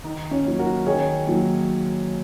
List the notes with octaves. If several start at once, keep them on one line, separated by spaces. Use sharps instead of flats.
D#3 D#4
C#4
F#3 A#3
F#4 A#4
D#3 G#4 C#5
F#3 A#3